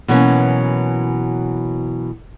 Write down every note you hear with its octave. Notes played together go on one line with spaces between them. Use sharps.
B2 E3 F#3 A#3 C#4